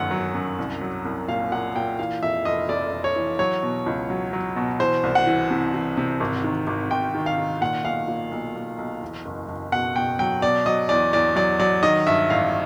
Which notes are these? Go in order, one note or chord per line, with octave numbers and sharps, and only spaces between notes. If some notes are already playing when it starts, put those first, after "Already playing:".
Already playing: G1 F#2 D#3 F#3 F#5
F#3
F#2
C2
F#3
C2
A#2 F5
A#2 F#5
A#2 G5
E3 F5
F2 E5
F1 D#5
F2 D5
F1
C#5
E3
F#3 C#5
B2
C#2
F#3
F#3
B2
E3 C5
C2
F#5
E3
C3
E3
C3
G#1
D#3
G#1
G#1 G5
D#3
F5
D#3
A#2 F#5
B1 F5
A#2
B1
B1
B1
E2
F#1
F#1
B2 F#5
B2 G5
F#3 G5
B2 D5
F#3 D#5
E2 D5
E2 D5
F#3 D5
F#3 D5
D#3 D#5
G2 E5
A1 F5